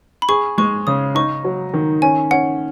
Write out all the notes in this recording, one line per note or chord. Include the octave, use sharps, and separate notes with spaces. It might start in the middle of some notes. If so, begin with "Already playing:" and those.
B5
G#4 C#6
G#3 C#6
C#3 D#6
D#4 C#6
F#3
D#3
C#4 G#5
C#4 F#5